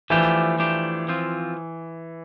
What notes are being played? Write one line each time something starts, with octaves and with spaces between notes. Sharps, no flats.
E3 F3 A3 D4 G4
F3 A3 D4 G4
F3 C4 F4